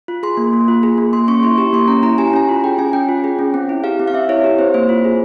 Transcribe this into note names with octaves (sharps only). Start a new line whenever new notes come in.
F4
G#4 C6
A#3
A#3
F4
G#4
A#3
A#3 C6
C#4 C#6
E4 C6
G4 C#6
A#3 C6
C#4 A#5
E4 A#5
G4 G#5
A#5
C#4 G#5
F4
G#4 G5
C#4 G#5
C#4 G5
F4
G#4
C#4
C4
E4
G4 F5
C4
F5
C4 E5
E4 C#5
G4
C4 C5
A#3 C5
F4
G#4